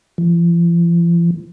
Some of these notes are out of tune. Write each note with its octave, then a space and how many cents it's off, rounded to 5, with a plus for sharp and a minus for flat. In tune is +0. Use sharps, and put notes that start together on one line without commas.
F3 -45